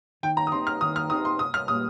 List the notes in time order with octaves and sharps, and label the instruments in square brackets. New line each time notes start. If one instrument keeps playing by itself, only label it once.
[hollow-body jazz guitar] D#3 [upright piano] G5
[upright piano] A#5
D#6
[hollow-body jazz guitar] C4 D#4 G4 [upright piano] C6
[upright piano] F6
[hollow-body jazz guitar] D#3 [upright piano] D#6
[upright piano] F6
[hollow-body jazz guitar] C4 D#4 G4 [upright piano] D#6
[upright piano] C6
[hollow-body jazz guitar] C2 [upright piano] D#6
[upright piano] F6
[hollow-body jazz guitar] A#2 G3 [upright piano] D#6